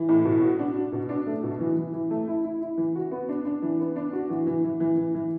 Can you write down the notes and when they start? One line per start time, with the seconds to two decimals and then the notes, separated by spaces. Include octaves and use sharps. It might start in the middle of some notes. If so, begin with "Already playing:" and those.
Already playing: E3
0.09 A2
0.25 B2
0.42 F#4
0.59 D4
0.76 F#4
0.92 B2
1.09 D4
1.26 A3
1.43 B2
1.60 E3
1.77 E3
1.93 E3
2.11 A3
2.27 E4
2.44 E4
2.62 E4
2.77 E3
2.95 F#4
3.11 B3
3.29 D4
3.45 D4
3.62 E3
3.80 B3
3.96 D4
4.13 F#4
4.30 E3
4.47 E3
4.64 E3
4.80 E3
4.97 E3
5.14 E3